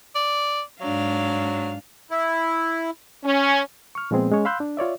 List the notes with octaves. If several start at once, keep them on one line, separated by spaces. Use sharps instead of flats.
D5
G#2 F#3 D4 F5
E4
C#4
C#6 F6
A#2 F3 G#3 B3 C4 G#4
G#3 C#4 C#5
F5 B5 C6 E6 F#6 G6
D4
F4 C#5 D5 E5